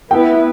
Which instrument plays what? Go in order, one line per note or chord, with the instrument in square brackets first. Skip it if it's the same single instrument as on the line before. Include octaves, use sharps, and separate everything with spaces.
[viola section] B3 E4 B4 [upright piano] G5